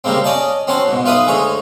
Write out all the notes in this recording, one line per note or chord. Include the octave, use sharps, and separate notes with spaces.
C#3 G3 G#3 A#3 C4
C#4 D5 D#5 A5
C4 C#4 F#4 A5 C6
G#2 B2
B1 F4 B4 E5 D#6
D2 G#3 G#4 C#5